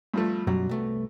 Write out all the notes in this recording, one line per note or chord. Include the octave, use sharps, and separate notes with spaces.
G2 F3 A3
F#2 B2 F#3 G3
C2 A3 B3